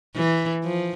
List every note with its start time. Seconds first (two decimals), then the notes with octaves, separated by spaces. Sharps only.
0.16 E3
0.64 F3